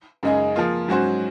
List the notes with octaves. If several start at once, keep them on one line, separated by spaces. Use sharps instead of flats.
F#2 C#3 G#3 D#4 G#4
F3 A#3 F4 G#4
G#2 F#3 C#4 F#4 C5